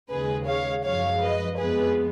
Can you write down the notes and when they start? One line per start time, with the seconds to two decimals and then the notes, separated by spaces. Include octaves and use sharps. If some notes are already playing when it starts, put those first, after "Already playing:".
0.10 D#2 C#3 G#3 G#4 B4
0.47 C#5 F5
0.84 F#2 F3 G#3 C#5 F5
1.21 B4 D#5
1.58 F2 F3 G#3 B3 G#4 B4